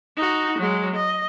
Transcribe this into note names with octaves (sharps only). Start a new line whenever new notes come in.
D#4 F#4
F#3 G#3
D#5